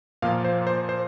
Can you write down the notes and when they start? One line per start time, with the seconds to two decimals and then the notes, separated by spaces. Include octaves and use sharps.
0.22 A#2 F3 A#3 F5
0.44 C5
0.67 C5
0.89 C5